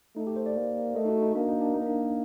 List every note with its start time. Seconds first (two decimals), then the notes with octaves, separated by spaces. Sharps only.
0.16 A3 D#4
0.27 G4
0.36 C5
0.46 D5
0.56 A#3
0.96 A3 D#5
1.05 D#4
1.09 F#4
1.22 D#4
1.35 A#3 D4
1.48 D#4
1.61 D4
1.74 A#3 D#4
1.86 D4